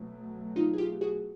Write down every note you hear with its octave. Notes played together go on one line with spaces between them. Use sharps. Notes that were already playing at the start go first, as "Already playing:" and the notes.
Already playing: B2 F#3 A3
D#4 F4
G#4
F4 G4
F#4 G#4